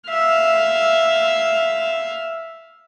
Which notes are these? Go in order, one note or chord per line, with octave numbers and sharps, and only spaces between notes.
E5 F5